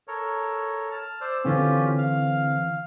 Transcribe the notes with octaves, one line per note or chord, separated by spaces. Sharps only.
A4 A#4 C#5
A5 F6
C5 D5 E6
D3 E3 C4 C#4 F4 G4
F5